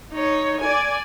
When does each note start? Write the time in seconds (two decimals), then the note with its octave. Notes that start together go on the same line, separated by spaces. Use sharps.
0.12 D#4 C#5
0.60 D5 G#5